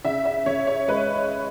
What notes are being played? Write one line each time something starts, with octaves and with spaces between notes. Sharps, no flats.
C#3 E5
E5
C#3 C#5
C#5
G#3 B4